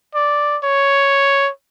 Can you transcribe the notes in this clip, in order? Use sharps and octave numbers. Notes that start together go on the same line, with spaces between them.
D5
C#5